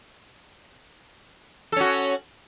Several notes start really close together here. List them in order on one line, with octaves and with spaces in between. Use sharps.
A4 C#4 F#4